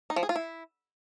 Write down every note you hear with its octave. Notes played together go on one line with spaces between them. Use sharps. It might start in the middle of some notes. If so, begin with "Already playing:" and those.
D#4
F3
G#4
F4
E4